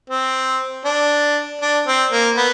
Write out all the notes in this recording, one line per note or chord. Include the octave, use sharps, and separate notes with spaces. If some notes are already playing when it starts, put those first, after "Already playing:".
C4
D4
D4
C4
A#3
B3